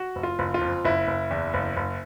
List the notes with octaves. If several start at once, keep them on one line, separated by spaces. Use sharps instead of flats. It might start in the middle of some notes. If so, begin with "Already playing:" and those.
Already playing: F#4
F#1
F4
F#1
F4
F2
F#1 E4
F#1
E2
F#1
F#1